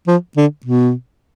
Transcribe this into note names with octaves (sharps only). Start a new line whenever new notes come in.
F3
D3
B2